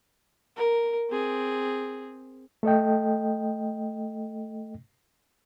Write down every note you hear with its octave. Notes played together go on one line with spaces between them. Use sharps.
A#4
C4 G#4
A3 A4 D#5 G5